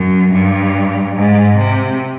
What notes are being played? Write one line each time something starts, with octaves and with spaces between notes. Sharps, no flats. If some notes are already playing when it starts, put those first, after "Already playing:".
Already playing: F#2
G2
G#2
C3